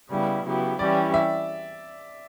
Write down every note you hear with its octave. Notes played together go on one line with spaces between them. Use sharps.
C#3 G3 B3 E4
C#3 F#3 B3 E4 G4
E3 G3 C#4 E4 G4 D5
E5